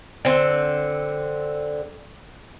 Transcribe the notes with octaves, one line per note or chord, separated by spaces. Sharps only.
D3 C4